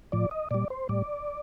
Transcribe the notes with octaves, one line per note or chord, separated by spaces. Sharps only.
A2 F3 D5
D#5
A#2 G3 D5
C5
A2 G3 D5